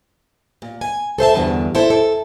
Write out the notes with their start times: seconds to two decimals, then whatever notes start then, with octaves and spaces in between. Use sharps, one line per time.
0.62 A#2
0.81 G#5
1.18 A4 C5 E5 A5
1.34 E2 G2 B2 D3
1.75 E4 A4 C5 D5
1.90 A4